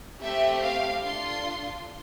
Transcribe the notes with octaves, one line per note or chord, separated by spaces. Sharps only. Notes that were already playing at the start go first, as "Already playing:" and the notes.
A3 C4 G4 E5
F5
D4 F4 A4 C6